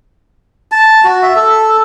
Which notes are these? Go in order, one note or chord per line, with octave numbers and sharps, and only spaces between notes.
A5
F#4
E5
A4